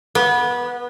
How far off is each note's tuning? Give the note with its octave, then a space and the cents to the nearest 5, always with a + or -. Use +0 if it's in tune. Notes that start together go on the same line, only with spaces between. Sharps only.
B3 -20